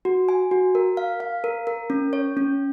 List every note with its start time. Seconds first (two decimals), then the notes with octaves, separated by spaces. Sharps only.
0.05 F#4
0.29 G#5
0.51 F#4
0.75 A#4
0.97 F5
1.20 F5
1.44 A#4
1.67 A#4
1.90 C#4
2.13 C#5
2.37 C#4